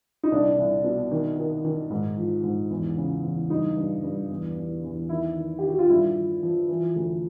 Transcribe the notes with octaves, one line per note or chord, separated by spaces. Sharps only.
D#4
C2 D4
C2
B2
D#3
D#3
D#3
G#2
F3
G#2
E2
C#3
E2
G2 D#4
G2
G2
E2
E2
E2
D#3 E4
D#3
D#3 G4
F#4
F4
G2 E4
F3
F3
E3
D2